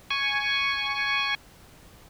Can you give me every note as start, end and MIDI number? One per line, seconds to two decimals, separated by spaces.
0.11 1.35 80
0.11 1.35 85